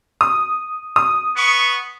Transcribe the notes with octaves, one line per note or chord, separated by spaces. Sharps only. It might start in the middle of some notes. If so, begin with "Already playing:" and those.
D#6
D#6
B3 C#6